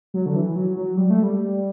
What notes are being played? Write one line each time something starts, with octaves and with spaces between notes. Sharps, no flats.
F#3
D3
E3
F#3
F#3
G3
A3
G3